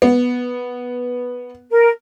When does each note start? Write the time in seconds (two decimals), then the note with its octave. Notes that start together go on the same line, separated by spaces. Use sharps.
0.02 B3
1.70 A#4